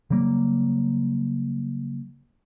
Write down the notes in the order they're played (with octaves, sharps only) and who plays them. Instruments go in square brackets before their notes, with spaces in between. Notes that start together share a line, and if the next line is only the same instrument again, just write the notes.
[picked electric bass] C#3 F#3 G3 A#3